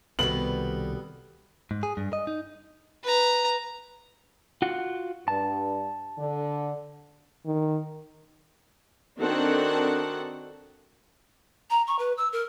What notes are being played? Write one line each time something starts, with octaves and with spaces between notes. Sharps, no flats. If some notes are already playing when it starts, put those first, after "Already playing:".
C2 B2 D#3 G3 B3 A4 F#7
G#2
G#4
G2
D#5
D#4
B4 A#5
F4 F#4 F#5
G2 A5
D3
D#3
D#3 C4 D4 F#4 A4 F#5
A#5
C#6
B4
E6
A#4